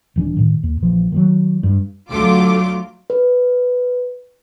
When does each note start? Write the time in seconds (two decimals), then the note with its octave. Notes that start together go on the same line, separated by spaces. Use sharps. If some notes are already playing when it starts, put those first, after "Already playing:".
0.16 D#1 E3 D4
0.37 A2 D#3
0.63 D#2
0.82 A#1 E3 F3
1.12 D#3 F3 F#3
1.63 G2
2.10 D2 F#3 A3 F4 D6
3.10 B4